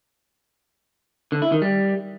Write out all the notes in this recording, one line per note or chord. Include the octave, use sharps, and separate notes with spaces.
D3
E4
D#3
G3